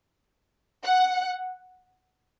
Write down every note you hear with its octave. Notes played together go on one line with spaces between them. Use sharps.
F#5